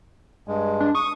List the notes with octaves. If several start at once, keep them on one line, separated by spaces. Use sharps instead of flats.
G2 G#3
D4
C#6 D#6